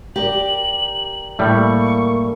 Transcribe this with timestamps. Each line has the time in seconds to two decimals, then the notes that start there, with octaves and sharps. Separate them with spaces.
0.16 G4 A#4 D5 F#7
1.39 A2 G3 A#3 C#6